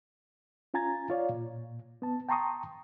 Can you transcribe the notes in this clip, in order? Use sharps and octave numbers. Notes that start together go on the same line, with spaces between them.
C#4 F4 G#5 A#5 G#6 A6
F4 C#5 D5 F5
A#2
B3 A5
G5 A5 A#5 C6 C#6 D#6